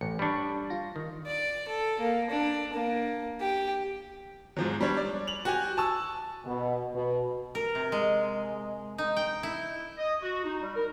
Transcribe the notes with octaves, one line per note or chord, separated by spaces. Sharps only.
A1 C#7
G3 D4 B5 C#6
F4 A#6
D#3
D5
A4
A#3
D4
A#3
G4
G#2 F3 F#3
G3 D4 C#5
D5
F7 F#7
F#4 G4 G#5
G#5 A5 C#6 E6
B2
B2
A#4
C3
G#3
D#4
G5
E4
D#5
F#4
D#4
G3
A#4